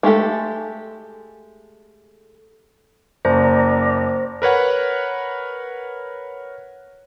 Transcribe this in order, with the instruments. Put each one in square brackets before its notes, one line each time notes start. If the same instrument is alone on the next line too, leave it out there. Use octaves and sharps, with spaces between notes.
[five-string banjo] G#3 A3 G4 A4
[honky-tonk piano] F#1 [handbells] C5 [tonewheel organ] D5 A#5
[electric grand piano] A#4 B4 C#5 F#5